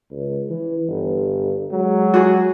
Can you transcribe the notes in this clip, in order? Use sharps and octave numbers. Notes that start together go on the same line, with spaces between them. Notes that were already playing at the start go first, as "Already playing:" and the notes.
C#2
E3
G1
F#3 G#3
F#4 G#4